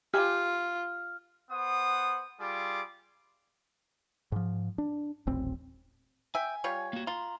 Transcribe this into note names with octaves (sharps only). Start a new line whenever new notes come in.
F4 G4 G#5 F6
B3 C5 F#5 D#6
G3 F4 G#4 D6
G#2 F3
D4
D#1 A1 C4
E5 G5 G#5
G3 F4 C#5
A#3 F#4
F4 A#5 C6